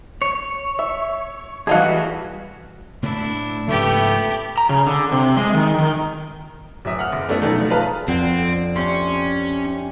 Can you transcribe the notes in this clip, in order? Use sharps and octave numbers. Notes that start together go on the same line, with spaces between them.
C#5
E5
E3 G3 A3 D#4 F#4 G#4 F5 F#5
A2 D3 A3 D4 E4
G#2 C#3 F3 A3 B3 G4
A#5
C#3
D3
C3
G#3
D#3
D#3
D1 F#3 E5 D#6
F#5 F6
F#1
G3 A3 B3 C#4 D4 E4
B2 D#3 F3 F#3 A3 B3
F4 G#4 B4 A5 A#5 F6
F2 D3 C4
C3 C#4 D4 C6